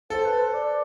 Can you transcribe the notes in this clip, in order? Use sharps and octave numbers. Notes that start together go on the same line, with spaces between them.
A4 C5
B4
C5
D5